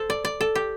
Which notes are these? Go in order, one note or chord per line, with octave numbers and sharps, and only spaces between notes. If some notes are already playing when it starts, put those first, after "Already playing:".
Already playing: A4 C5
D5
D5
A4
G4